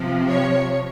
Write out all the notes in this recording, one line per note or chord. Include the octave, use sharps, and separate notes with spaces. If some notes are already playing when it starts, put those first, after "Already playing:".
Already playing: C3 F3
C#5